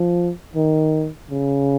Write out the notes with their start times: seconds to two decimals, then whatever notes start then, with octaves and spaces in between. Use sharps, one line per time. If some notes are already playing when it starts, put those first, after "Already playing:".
Already playing: F3
0.55 D#3
1.31 C#3